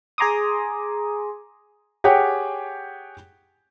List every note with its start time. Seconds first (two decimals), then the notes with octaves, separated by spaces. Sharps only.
0.18 G#4 G#5 A#5 C6 D6 D#6
2.04 G4 G#4 C#5 F#5 G5